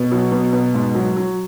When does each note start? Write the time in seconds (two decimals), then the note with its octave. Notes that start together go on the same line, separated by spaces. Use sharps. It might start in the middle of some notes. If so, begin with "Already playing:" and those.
Already playing: B2
0.12 F#3
0.32 B2
0.53 B2
0.74 G#2
0.95 F#3
1.16 F#3